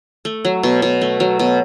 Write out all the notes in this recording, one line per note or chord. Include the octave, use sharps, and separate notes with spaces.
A3
F#3
B2
B2
A3
F#3
B2